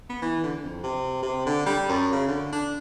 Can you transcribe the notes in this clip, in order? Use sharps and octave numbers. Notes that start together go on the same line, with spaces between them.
B3
E3
D3
F2
C3
C3
D3
G3
F#2
C#3
D3
D4